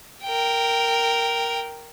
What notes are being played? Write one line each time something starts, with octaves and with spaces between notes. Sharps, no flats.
A#4 G5